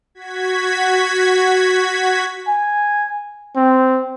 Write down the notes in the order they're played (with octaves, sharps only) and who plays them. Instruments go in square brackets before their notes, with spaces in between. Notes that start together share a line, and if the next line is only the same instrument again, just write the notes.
[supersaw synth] F#4 G#6 B6
[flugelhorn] G#5
C4